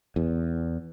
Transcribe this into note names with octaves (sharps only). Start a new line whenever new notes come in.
E2